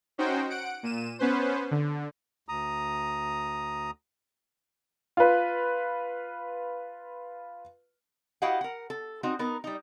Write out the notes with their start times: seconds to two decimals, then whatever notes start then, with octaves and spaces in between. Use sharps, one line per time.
0.18 C#4 D#4 F#4 C5 G5
0.50 F#5 D7
0.83 A#2 D#7 E7
1.19 B3 C#4 B4 C5
1.71 D3
2.49 D2 A#5 D#6
5.17 F4 B4
8.42 E4 F#4 G4 D#5 F5 F#5
8.61 A#4 F#5
8.90 A4
9.23 C4 D#4 F#4
9.39 B3 D#4 A#4
9.64 G3 D#4